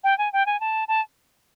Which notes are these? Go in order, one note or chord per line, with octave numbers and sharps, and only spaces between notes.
G5
G#5
G5
G#5
A5
A5